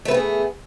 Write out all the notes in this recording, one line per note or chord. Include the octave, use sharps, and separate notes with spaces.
A3 B3 G#4 B4